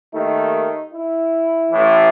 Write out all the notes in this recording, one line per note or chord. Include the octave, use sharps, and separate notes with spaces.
D#2 D#3 A3 D#4
E4
A1 A2 E3